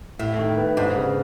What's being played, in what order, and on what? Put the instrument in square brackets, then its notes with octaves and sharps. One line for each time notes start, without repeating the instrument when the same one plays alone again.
[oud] A2 [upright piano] E4
[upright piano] D#3
B3
[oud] G#2 [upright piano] D4
[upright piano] C#3